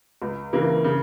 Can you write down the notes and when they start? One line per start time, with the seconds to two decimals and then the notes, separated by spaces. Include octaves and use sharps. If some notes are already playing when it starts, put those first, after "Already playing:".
0.22 C#2
0.53 C#3 E3 A#3
0.84 C#3